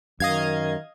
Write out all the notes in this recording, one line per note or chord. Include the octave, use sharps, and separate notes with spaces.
F#2 D#3 D#5 F5 G#6